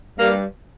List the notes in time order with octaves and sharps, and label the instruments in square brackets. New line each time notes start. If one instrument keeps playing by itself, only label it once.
[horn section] G2 G3 A#3